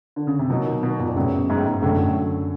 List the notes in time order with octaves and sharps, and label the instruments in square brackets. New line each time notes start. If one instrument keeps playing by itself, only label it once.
[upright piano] D3
C#3
C3
[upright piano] B2 [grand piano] F#3 A#3 D#4
[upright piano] B2
B2
A#2
A#2
[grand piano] F#2 C#3 F#3 B3 [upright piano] A2
[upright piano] G#2
A2
G#2
[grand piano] F#2 D3 F#3 [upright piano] A2
[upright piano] A2